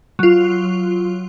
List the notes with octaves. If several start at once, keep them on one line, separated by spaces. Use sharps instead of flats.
F#3 F4